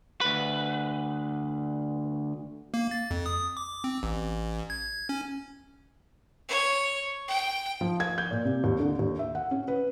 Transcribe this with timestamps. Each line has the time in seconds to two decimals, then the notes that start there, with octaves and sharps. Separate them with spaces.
0.21 D2 B4
2.74 A#3
2.91 A6
3.11 F2
3.26 D#6
3.57 D6
3.84 C4
4.03 A1
4.70 G#6
5.09 C#4
6.49 C#5
7.28 G5
7.81 F3
8.00 G#6
8.18 G6
8.31 A#2
8.45 C3
8.64 D#2
8.80 D3
8.99 D#2
9.19 E5
9.35 F#5
9.51 C#4
9.68 B4